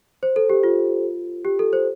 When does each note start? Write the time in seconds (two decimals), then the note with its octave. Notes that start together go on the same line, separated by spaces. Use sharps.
0.23 C5
0.36 A4
0.50 G4
0.63 F4
1.45 G4
1.59 A4
1.73 C5